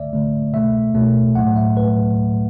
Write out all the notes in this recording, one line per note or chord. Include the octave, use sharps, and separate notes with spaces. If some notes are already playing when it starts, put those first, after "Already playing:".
Already playing: D3 A3 D5 E5
D3 A3
B2 A3 E5
B2 A3
A2 F#3 A3 F#5
E5
A2 F#3 A3 B4